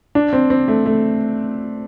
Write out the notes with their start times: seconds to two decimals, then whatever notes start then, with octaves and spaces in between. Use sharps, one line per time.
0.15 D4
0.33 C4
0.50 C4
0.68 A3
0.86 A3